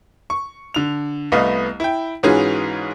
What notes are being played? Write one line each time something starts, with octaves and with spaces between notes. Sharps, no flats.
C#6
D3 F7
C2 A3 B3 D#5 F5
E4 G5
G#2 E3 C#4 F4 F#4 G#4